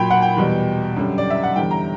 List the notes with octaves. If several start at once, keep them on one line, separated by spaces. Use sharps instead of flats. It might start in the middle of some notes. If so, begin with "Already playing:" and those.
Already playing: A#2 F#3 G5 B5
F#5
G5
E2 B2 G3
F#2 D3 G3
D5
E5
F#5
E2 D3 G3 G5
A#5